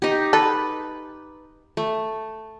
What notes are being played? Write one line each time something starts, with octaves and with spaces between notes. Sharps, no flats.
D#4 G4
A4 B4
A3